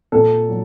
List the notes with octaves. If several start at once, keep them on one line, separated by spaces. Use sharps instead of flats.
A#2 A4
F#3